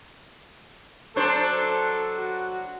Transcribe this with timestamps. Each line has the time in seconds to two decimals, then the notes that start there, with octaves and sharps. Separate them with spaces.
1.16 F#3 D4 A4 C5
2.17 F#4